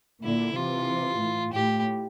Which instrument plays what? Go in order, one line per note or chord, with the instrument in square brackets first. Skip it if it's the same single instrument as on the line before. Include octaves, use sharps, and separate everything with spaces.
[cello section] A#2 D3 [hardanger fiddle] E4
[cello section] C3 E3 [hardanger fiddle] F4
[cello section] A2
[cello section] A2 [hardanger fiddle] G4